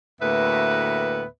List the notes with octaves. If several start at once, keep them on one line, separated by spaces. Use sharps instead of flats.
D2 A2 A#3 B3 B4 E5